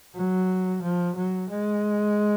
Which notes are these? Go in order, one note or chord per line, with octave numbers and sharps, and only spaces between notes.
F#3
F3
F#3
G#3